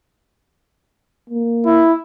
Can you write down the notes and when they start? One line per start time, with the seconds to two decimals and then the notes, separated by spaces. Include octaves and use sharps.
1.30 A#3
1.66 E4